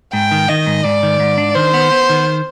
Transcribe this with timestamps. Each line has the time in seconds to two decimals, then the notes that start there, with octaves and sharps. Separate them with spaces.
0.13 G#2 G5
0.31 D#3
0.49 D#3 D#5
0.67 G#2
0.84 G#2 D5
1.03 D#3
1.20 G#2
1.38 D4
1.56 D#3 C5
1.74 B3
1.91 B3
2.09 D#3